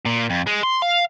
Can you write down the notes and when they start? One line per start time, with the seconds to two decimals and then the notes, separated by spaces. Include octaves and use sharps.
0.06 A#2
0.30 F2
0.46 G#3
0.63 C6
0.82 F5